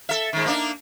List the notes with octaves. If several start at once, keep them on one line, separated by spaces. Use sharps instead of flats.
A4 E5
G#2 D#3
A#3 D4 D#4